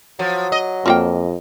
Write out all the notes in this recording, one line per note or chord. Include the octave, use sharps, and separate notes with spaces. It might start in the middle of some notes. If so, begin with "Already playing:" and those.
F3 F#3
D#5
F2 F3 A#3 G5